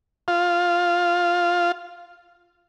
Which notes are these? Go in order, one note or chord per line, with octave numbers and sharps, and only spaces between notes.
F4 F5